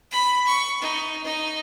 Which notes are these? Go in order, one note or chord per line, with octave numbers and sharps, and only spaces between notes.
B5
C#6
D#4
D#4